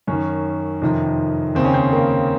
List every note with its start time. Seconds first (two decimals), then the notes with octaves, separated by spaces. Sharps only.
0.07 F#2 D#3 C#4
0.82 F2 C3 D#3
1.55 D#2 C#3 C4
1.65 C#4
1.74 C4
1.93 A#3